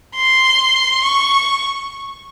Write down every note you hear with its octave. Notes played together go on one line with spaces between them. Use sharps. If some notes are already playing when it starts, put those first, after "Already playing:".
C6
C#6